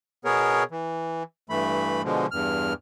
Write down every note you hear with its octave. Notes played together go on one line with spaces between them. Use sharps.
B2 B3 G#4 A#4 C#5
E3
G2 E3 A3 B5
B2 D3 F3 G#3
E2 G2 F6